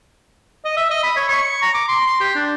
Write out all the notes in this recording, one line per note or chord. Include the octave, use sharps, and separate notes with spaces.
D#5
E5
D#5
B5
C#5
C#6
A#5
D6
C6
C6
G4
D4